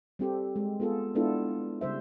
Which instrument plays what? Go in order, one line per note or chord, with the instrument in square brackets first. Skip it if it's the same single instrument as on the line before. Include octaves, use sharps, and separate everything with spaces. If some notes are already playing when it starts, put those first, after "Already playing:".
[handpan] G3 C4 G4 A4
G#3
B3 F4 G#4 A4
G#3 B3 D4 E4 F4 A4
C#3 G3 C5 E5